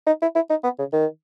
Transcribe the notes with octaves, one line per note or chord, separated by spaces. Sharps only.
D#4
E4
E4
D#4
B3
C#3
D#3